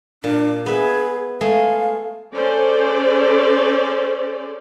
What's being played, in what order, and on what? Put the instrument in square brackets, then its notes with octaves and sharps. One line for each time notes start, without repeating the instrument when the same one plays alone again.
[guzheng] A#2 [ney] D4
[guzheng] B3 E5 [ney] G#4
[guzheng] G#3 A3 G#4 [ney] F5
[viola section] C#4 G#4 A4 C5 D5